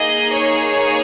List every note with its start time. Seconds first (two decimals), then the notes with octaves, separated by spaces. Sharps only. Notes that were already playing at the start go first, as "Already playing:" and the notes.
Already playing: A#3 D#4 G#4 D#5
0.35 C#5